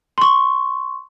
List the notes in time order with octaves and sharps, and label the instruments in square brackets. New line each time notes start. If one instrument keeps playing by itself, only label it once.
[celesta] C6 C#6